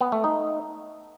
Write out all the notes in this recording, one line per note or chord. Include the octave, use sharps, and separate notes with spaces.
B3
A3
D#4